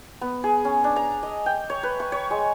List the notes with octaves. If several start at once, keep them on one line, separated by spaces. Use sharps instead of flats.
B3
G#4
C#4
D4
A#5
D#5
G5
C#5
B4
C#6
C#5
G#3